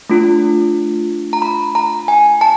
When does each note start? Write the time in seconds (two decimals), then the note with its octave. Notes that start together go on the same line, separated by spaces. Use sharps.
0.10 A3 D4 F4
1.33 A#5
1.42 B5
1.75 A#5
2.08 G#5
2.41 A5